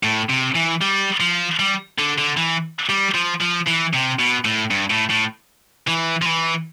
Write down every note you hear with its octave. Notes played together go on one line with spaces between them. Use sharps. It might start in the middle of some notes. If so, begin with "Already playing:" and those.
A2
C3
E3
G3
F3
G3
D3
D3
E3
G3
F3
F3
E3
C3
B2
A2
G2
A2
A2
E3
F3
E3